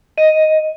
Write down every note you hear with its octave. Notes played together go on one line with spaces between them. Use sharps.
D#5